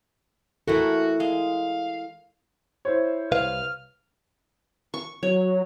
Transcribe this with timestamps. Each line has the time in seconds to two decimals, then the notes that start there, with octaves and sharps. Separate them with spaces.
0.68 E3 A3 E4 F#4 A4 A#4
1.20 G#3 F5
2.85 E4 C5 C#5
3.32 C2 B4 F5 F6
4.94 C#6
5.23 F#3 C#5